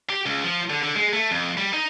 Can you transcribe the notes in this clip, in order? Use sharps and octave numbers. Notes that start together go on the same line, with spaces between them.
G4
C#2
F3
D3
D3
G#3
A3
F2
G3
D#4